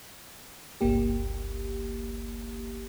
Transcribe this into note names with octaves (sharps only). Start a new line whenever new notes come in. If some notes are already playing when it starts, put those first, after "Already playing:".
G1 C#2 A#3 G4